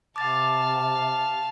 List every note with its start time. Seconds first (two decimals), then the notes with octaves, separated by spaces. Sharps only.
0.16 C3 F5 A5 D6 A6